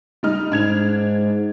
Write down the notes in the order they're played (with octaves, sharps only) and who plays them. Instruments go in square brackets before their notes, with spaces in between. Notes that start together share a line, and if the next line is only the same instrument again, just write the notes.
[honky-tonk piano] G3 D#4 F6
[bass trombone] G#2 [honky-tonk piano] D4 G#6 F7